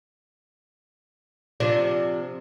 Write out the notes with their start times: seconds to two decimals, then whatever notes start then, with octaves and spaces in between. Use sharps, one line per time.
1.60 C3 F3 D4